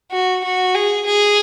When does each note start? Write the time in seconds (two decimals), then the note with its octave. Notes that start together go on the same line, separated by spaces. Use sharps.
0.12 F#4
0.44 F#4
0.75 G#4
1.06 G#4